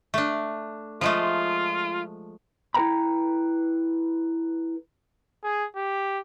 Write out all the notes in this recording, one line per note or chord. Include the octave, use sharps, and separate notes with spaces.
A3 D4
F3 G#3 A3 F4
E4 A4 B4 G5 A#5 B5
G#4
G4